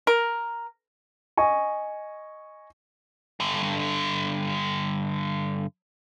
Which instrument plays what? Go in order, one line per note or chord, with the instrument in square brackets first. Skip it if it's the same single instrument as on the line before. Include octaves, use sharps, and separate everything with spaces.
[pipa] A#4
[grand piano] D#5 G#5 C#6
[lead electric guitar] G2 D3